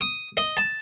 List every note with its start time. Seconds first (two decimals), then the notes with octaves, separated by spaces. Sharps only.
0.01 D#6
0.37 D#5
0.57 A5